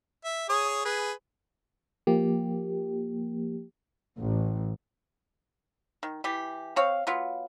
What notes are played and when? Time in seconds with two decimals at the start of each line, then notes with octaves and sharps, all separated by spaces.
0.24 E5
0.49 G#4 C#5 D#6
0.85 G#4 B4
2.07 F3 A#3 G4
4.19 A1
6.03 D#3
6.24 E3 G4
6.76 C4 C#5 F5
7.07 F#3 B3 F4